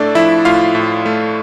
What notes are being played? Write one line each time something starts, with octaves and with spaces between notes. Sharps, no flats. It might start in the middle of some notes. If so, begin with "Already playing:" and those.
Already playing: A2 A3 D4 A4 D5
F3 E4 E5
A2 F4 F5
A2
A3